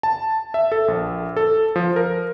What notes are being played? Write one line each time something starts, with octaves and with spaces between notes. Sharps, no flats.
A5
E5
A4
A#1
A4
F3
A#4